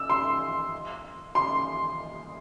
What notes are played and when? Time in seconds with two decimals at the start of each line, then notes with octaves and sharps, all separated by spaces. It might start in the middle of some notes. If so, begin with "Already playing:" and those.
Already playing: E6
0.10 C6
1.35 C6